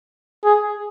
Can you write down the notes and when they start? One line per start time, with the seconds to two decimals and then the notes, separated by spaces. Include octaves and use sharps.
0.44 G#4